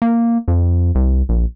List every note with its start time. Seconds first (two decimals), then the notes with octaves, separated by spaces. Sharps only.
0.02 A#3
0.48 F2
0.95 C2
1.29 A#1